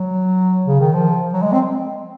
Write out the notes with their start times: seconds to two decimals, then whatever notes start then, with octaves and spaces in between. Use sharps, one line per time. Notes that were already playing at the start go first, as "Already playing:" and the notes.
Already playing: F#3
0.67 C#3
0.80 D#3
0.93 F3
1.33 F#3
1.42 G#3
1.52 C4